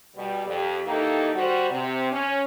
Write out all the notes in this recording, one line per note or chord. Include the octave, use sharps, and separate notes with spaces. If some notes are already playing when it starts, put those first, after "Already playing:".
B2 G3
F2 G4
D#3 E3 A#3 D#4 G4 A4
G3 F#4 C5
C3
C#4